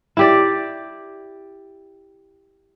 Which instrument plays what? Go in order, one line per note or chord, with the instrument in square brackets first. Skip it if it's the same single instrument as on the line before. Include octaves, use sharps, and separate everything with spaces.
[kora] E4 G4 D5